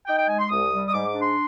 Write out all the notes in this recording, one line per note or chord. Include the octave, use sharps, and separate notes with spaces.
D#4 G5
G5
G#3 G#5
C6
C2 D#6
G3
D#6
G#2 D6
D6
D4
C6